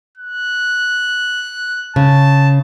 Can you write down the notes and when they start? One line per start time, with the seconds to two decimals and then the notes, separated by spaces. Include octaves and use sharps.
0.18 F#6
1.96 C#3 A5